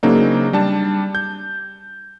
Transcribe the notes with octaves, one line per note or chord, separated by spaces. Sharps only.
C#3 F#3 A#3 C4 D4 D#4
G3 D4 A5
G6